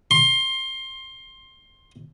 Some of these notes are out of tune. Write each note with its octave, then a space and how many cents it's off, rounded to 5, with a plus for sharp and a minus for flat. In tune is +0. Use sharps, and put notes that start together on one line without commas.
C6 +20